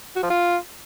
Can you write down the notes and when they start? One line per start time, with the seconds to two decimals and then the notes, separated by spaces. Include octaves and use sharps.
0.16 F#4
0.23 F3
0.30 F4